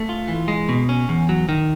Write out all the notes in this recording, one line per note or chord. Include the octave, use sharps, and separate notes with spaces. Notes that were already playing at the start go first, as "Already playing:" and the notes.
Already playing: A3
F4
E3
G#3
B2
C#4
E2
F#3
D#3